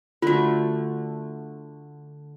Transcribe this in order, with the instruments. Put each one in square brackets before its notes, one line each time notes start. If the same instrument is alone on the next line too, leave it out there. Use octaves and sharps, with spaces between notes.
[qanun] D3 A3 [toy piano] F4 F#4